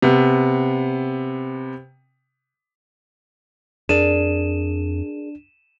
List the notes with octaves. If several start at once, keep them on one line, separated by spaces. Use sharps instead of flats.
C3 B3
F2 D4 G#4 A#4 D5 D#7 E7